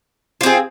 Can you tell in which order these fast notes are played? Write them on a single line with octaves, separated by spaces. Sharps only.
F4 C4 G#4